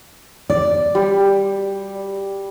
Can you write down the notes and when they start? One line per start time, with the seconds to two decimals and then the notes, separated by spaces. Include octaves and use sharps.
0.50 D5
0.95 G3